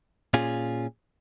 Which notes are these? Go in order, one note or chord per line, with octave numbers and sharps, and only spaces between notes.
A#2 C#4 F4 G#4